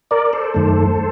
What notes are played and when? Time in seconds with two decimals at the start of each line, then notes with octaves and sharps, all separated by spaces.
0.11 A#4 D5
0.33 A4 C5
0.54 F#2 D#3 A3